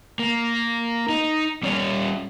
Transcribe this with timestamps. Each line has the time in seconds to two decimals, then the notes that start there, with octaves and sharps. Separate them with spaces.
0.19 A#3
1.09 D#4
1.63 G3 C#4 C#5